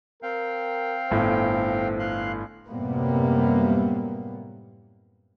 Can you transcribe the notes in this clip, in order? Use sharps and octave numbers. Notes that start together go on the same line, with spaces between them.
C4 A#4 F5 G5
G1 A2 C5
F5 C6 F#6
F#2 A2 C3 G3 A#3 B3